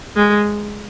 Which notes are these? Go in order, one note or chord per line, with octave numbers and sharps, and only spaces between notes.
G#3